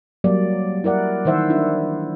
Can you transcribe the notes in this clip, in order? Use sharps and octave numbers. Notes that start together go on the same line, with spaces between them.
F#3 G3 A#3 D5
E4 A#4 D5 F#5
D#3 E3 C5 E5 F#5
D4 E4